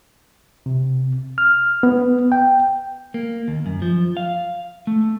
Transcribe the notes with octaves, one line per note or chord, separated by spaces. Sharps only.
C3
F6
B3
G5
A#3
D#2
F#2
F3
F5
A3